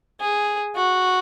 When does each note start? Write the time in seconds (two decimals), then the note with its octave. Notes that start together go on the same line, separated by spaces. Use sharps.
0.21 G#4
0.76 F#4